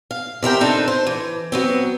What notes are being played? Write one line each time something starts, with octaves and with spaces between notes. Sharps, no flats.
F5
C3 E4 A#4 G5
C4 D4 D#4 A4
C5
E3
F#3 B3 C4